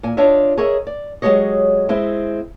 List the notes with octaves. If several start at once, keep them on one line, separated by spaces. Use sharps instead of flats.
A#2 G#5
D4 F4 C#5 D#5 E5
G#4 A#4 C#5 D#5 E5
D5
F#3 G#3 A#3 G4 C#5 D#5
G#3 C4 E4 E5